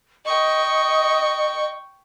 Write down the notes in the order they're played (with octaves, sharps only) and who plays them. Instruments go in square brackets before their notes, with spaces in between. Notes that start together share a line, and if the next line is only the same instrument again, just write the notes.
[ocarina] D#5 [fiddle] G5 C#6